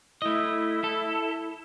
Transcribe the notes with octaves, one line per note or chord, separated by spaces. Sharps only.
A3 E4 D#5
A4